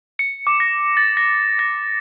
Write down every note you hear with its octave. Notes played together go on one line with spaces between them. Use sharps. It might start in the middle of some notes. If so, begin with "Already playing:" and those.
C#7
D6
A#6
A6
A#6
A#6